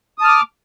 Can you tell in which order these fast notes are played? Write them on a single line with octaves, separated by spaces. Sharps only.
D#6 A5 F6 D6